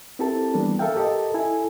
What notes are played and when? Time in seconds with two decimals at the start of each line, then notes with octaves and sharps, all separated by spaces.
0.19 C4 E4 G4 A4 A#4 A5
0.54 E3 G3 A#3 B3 D4
0.79 A4 A#4 E5 F5 G5
0.97 G4 A4 A#4 D#5 A5
1.34 E4 A4 G#5